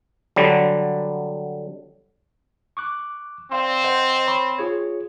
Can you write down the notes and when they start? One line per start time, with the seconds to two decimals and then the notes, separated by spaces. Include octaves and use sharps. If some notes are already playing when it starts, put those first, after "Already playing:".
0.36 D3 F#3 G3
2.77 C#6 D6 F#6
3.52 C4 D5 F5 C6
3.84 C5 D#5 F#5
4.27 C#5 B5 C#6
4.58 F4 G#4 C#5